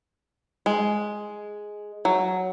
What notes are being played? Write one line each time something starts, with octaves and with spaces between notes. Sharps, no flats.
G#3
F#3